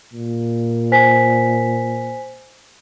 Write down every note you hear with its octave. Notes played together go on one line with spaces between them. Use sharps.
A#2
C5 G#5 B6